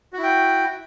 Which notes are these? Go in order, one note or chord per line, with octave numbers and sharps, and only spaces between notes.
E4 F#4 G5